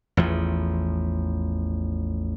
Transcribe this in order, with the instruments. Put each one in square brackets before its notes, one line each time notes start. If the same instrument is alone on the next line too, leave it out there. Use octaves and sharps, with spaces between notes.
[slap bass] A1 E2 F3